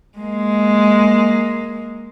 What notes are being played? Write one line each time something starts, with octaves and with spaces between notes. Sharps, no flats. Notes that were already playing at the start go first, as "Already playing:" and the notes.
G#3 A#3